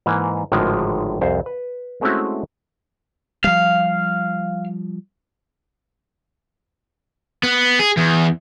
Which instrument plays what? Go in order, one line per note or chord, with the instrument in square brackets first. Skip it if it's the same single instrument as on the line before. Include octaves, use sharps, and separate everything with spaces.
[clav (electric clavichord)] G#2 E3 A#3
G#1 A2 D3 D#3 F3 G#3
C2 F2 C5
B4
G#3 A3 C4 C#4 E4 F#4
[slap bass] F3 G3 [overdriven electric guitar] F5
[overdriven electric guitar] B3
G#4
E2